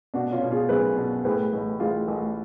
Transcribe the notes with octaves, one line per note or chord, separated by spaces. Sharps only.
B2 D4 F#4
C#4 F4
B2
F4 G#4
B1 G#4 B4
B2
A2 G#4 B4
A1
A1 F4 G#4
A1